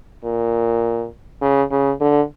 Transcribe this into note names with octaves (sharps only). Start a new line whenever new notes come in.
A#2
C#3
C#3
D3